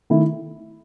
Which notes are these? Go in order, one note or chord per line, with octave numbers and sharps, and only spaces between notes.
D#3 A3 E4